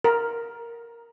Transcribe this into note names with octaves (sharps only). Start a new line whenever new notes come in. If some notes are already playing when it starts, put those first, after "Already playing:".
A#4